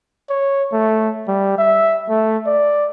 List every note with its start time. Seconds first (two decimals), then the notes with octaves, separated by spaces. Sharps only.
0.30 C#5
0.72 A3
1.28 G3
1.58 E5
2.10 A3
2.46 D5